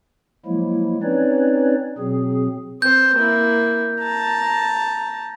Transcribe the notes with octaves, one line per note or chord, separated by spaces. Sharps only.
F3 F#3 G#3 A#3 E4
C4 C#4 D#4 B4 C#5 D5
B2 F#3 C4 G#4
C4 C5 G6
A#3 E4
A5 A#5